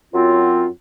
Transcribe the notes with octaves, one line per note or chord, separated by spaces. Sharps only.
F#2 F#3 C4 F4